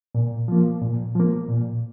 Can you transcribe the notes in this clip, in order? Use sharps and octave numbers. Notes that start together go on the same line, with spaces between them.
A#2
F3 A#3
A#2
F3 A#3
A#2